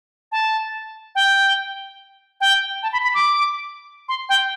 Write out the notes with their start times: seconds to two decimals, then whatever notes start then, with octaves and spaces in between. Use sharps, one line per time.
0.32 A5
1.15 G5
2.41 G5
2.83 A5
2.93 B5
3.03 B5
3.14 D6
4.09 C6
4.29 G5